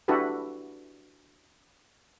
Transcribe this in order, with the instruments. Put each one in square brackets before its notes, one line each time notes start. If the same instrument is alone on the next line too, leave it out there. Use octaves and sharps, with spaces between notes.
[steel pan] D4 E4 F#4 G4 A4 B4